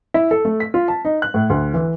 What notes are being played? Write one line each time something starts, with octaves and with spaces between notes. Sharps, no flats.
E4
A4
A3
B6
F4
A5
D#4
F#6
A2
D2
E3